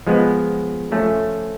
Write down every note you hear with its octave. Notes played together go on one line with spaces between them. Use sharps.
F3 G#3 B3
F3 A3 C#4